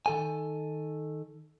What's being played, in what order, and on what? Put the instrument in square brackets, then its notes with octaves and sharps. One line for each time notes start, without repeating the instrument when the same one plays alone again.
[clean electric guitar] D#3 A4 G#5